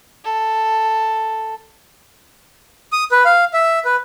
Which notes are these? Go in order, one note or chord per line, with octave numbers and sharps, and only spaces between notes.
A4
D#6
B4
F5
E5
B4